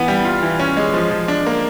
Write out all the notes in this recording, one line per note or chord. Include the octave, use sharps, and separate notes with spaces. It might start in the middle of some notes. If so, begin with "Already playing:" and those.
Already playing: E3 B3 E4
G3
F4
E3
C#4
G#3
F3
F3
D4
A#3